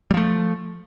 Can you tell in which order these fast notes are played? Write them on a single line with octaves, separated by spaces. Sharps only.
G3 F3 A3